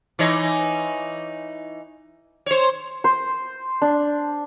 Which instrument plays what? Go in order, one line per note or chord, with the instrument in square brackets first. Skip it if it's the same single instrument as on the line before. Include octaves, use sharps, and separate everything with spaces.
[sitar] E3 D#4 C#5
C5 C#5
[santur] C5
D4